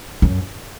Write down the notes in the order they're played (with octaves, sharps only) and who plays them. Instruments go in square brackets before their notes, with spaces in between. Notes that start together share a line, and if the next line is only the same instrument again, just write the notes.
[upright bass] F#2